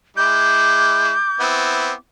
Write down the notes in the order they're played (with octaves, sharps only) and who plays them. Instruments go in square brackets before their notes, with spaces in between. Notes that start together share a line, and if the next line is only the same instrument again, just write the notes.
[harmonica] G#3 E4 [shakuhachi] D6 [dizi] G6
[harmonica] B3 C4 E4